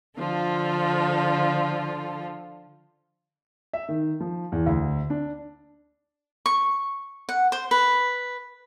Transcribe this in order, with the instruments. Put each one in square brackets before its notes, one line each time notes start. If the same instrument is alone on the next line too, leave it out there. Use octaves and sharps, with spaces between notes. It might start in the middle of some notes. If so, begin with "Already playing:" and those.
[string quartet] D3 F3 F4 A4
[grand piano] E5
D#3
F3
E2
D2
D4
[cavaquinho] C#6
F#5
C5
B4